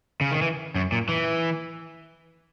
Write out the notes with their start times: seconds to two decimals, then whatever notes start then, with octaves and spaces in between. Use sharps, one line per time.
0.21 C#3
0.31 D#3
0.42 E3
0.75 F#2
0.92 A#2
1.09 E3